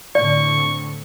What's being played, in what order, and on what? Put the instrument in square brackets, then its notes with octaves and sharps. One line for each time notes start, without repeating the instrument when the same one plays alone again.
[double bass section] A2 D3 C4 [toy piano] D5 [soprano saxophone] C#6